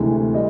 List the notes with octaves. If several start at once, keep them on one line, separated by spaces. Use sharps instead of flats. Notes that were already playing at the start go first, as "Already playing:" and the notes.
Already playing: D2 C3 E3 G#3
G3 D#5